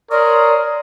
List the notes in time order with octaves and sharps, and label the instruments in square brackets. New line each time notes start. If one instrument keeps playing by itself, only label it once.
[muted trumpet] A#4 [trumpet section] C#5 C6 D#6 [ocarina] D5